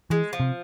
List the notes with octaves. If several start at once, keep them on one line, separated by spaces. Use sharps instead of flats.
E3 G#3
F3
C3